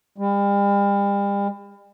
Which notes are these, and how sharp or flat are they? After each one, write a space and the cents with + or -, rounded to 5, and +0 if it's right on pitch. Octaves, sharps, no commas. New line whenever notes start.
G3 +40